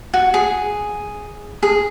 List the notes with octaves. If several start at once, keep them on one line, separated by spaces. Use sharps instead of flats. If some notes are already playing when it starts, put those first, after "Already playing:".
F#4
G#4
G#4